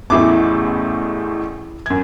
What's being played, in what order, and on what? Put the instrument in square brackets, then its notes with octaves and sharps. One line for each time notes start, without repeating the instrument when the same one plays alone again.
[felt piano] A1 E2 A2 [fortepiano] E3 E4 D6
[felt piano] F#2 G#6